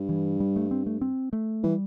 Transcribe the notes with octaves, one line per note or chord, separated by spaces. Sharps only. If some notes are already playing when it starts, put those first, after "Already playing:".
Already playing: G2
E3
G3
A3
C4
A3
C4
A3
E3 G3